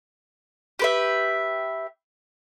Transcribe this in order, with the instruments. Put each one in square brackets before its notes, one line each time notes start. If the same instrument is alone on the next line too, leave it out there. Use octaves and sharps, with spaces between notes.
[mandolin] G4 B4 E5